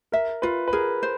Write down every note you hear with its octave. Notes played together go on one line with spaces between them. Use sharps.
A#4 E5
F4 B4
B4
G#4 A#4
C5